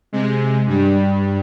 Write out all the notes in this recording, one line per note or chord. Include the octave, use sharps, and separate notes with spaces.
C3 G#3
G2 G3